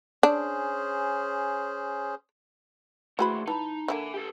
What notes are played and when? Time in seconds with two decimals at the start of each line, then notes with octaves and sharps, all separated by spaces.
0.23 C#4 D4 G#4 C5
3.19 D#2 E3 A3 F#4 G#4 C5 G#5 B5
3.47 E3 D#4 A5 B5
3.88 D3 F#3 A#3 E5 G#5
4.14 G4 A4